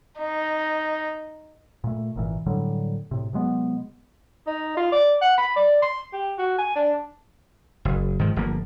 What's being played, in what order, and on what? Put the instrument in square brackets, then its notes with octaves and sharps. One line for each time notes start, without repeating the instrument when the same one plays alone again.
[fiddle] D#4
[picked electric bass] A#2 A3
G#1 A#2 E3
A2 D3 F#3 G3
A2 C3
C3 F#3 G#3 B3
[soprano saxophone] D#4
F4
D5
F#5
B5
D5
C6
G4
F#4
G#5
D4
[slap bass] F#1
G#2 D#3 F3
G1 F3 A#3